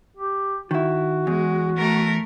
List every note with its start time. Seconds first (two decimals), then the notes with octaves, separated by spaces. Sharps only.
0.17 G4
0.71 D#3 E4 F#4
1.27 E2 G#3
1.77 A3 A#4